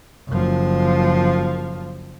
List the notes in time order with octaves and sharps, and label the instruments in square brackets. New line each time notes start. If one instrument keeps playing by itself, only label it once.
[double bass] F#1 F3